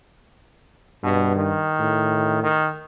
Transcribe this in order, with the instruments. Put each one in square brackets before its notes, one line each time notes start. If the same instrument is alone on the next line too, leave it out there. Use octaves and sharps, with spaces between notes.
[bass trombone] G2 [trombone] B2
[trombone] D#3
[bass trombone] A2
[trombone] D#3